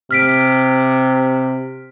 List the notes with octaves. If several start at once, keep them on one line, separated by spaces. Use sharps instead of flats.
C3 F6 B6 D7